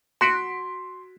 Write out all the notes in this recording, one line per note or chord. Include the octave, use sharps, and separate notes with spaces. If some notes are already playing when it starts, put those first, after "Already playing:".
F#4 C6 B6 D7